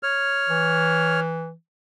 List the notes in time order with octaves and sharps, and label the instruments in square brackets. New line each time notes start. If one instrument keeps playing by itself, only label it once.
[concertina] C#5 F6
[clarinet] E3